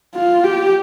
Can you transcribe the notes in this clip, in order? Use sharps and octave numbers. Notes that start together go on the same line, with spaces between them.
F4
G4